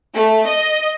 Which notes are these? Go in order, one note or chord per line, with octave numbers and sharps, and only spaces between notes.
A3
D#5